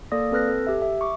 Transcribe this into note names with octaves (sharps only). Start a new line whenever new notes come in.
A#3 A4 D5 D#6 A#6
C4 A4 B4 F6 F#6 A#6
A4
G4 E5
E5
C#6 D6